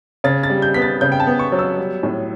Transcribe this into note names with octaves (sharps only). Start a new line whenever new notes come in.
C#3 A6
A6
G3
G6
B3 B6
A6
C#3 G6
G5
A5
B3
C#6
F#3
E6
G3
A2